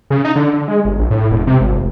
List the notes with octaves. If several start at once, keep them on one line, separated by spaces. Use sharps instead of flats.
C#3
D#4
D3
D3
G#3
G1
A#1
A2
E1
C3
G#1
F1